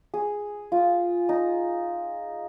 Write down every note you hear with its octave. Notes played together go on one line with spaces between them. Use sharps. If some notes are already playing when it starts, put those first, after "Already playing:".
G#4
F4
D#4